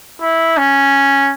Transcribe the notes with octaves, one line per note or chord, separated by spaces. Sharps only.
E4
C#4